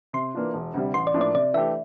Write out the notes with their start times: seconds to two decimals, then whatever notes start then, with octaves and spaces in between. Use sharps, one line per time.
0.13 C3 C6
0.34 E3 A#3 D4 F4
0.54 E1
0.74 D2 C3 G3
0.94 A1 C6
1.07 D5
1.14 A2 F3 A#3 D4
1.21 D5
1.34 C3 D5
1.54 E3 A3 D4 G4 E5